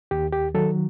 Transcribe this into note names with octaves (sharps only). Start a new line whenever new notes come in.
D#2 G4
G4
D#3 F#3 A4